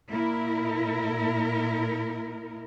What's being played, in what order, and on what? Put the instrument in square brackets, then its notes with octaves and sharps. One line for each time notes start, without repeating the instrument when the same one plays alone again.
[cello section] A#2 E4 A#4